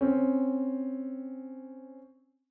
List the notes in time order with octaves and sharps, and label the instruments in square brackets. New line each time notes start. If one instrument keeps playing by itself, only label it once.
[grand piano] C4 C#4